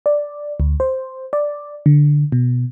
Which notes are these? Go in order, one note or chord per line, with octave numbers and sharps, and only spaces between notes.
D5
D2
C5
D5
D3
B2